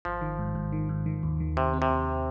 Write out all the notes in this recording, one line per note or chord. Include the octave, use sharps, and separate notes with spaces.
G#1 F3
D#3
G#2
G#2
D#3
G#2
D#3
D#2
D#3
D#2 C3
C4
C3
D#2